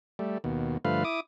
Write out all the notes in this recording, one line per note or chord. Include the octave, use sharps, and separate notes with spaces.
G3 A3
D#2 B2
G2 D3 F3 A3 B4 F5
E4 D6 D#6